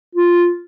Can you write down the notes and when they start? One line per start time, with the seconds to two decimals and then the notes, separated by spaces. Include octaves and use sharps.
0.15 F4